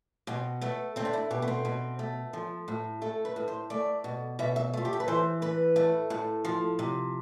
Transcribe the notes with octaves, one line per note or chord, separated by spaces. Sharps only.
B2 C4
A3 B3
A3 C4
D4
E4
B2 G4
B3
C4
B2
A3
F3
A2
A3 A4
B4
A2
C5
A3 D5
B2
B2 E5
E5
A3 F4
G4
A4
B4
E3 C5
A2 B4
A3
A2
F3
C3